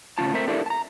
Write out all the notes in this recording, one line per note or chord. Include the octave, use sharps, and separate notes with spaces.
A2 C#3 C#4 F4 A5
A3 C4 A#4 C5 E5
D4 E4 G4 A4 A#4 E5
A5 A#5